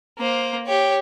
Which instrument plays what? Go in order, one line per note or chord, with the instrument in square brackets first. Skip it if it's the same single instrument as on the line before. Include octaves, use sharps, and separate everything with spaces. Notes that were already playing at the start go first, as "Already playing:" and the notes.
[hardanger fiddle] A#3 C5
G4 C#5